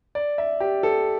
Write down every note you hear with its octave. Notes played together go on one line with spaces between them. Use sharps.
D5
E5
G4
A4